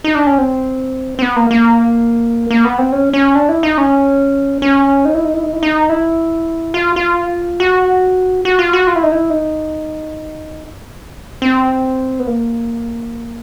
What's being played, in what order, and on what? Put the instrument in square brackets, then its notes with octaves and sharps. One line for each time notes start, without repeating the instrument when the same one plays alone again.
[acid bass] D#4
D4
C#4
C4
C4
B3
A#3
A#3
A#3
B3
C4
C#4
C#4
D4
E4
D#4
C#4
C#4
D#4
E4
D#4
E4
D#4
E4
D#4
E4
F4
F4
F#4
F#4
F4
F#4
F4
E4
D#4
E4
D#4
C4
B3
A#3